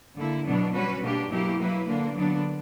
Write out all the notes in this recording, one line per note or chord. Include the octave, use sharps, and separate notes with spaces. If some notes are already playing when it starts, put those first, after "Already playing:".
D3 A#3 E4
B2 F#3 B3 D4
G3 C#4 F#4 B4
B2 A#3 D4 G4
B2 F#3 A#3 E4 G4
F#3 A#3 E4 B4
D3 A#3 D4
D3 F#3 B3 D4